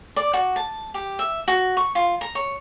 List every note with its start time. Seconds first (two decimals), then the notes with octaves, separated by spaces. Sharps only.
0.16 D5
0.33 F#4
0.56 A5
0.94 G4
1.19 E5
1.48 F#4
1.77 C#6
1.95 F4
2.21 A#5
2.35 C#5